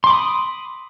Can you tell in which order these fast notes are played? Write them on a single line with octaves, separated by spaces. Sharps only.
C6 D6 B5 D#6